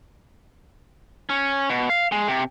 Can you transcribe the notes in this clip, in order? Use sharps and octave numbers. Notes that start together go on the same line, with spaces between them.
C#4
B2
F5
G#3
C3